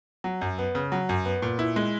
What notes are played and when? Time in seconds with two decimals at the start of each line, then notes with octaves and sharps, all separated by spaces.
0.24 F#3
0.41 F#2
0.58 B3
0.75 C#3
0.92 F#3
1.09 F#2
1.25 B3
1.42 A#2
1.59 E4
1.76 G#3